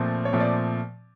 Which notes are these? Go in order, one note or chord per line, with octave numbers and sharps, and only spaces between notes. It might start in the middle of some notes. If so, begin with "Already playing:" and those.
Already playing: A#2 F3 A3 C4
C#5
A#2 F3 A3 C4
D5